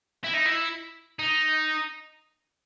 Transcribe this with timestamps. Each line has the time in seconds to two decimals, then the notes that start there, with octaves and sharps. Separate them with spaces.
0.24 E4
0.34 D#4
0.46 E4
1.19 D#4